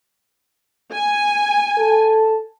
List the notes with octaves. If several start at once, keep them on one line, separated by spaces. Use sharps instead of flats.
G#5
A4